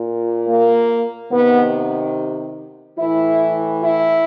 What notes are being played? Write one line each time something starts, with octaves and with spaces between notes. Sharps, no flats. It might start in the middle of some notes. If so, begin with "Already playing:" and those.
Already playing: A#2
A#3
C3 D#3 B3
A2 E3 E4
E4